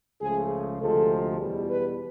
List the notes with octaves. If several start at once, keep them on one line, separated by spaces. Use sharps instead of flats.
C#2 C#3 F3 A3 G#4
D2 C3 F3 G#3 A4
E2 B2 G3
B4